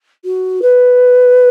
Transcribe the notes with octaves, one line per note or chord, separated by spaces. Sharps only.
F#4
B4